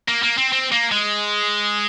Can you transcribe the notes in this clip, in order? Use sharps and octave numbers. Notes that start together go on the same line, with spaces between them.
A#3
A#3
C4
C4
A#3
G#3